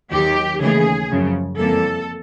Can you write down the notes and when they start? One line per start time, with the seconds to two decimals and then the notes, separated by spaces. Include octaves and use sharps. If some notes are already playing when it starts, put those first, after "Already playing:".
0.11 D#2 D#3 F#3 G4
0.60 D#2 C#3 E3 A3 G#4
1.10 F#2 C#3 F3
1.58 F2 C3 E3 G3 A#3 A4